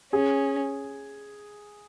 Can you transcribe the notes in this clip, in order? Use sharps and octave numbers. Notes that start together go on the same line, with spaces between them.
C#4 G#4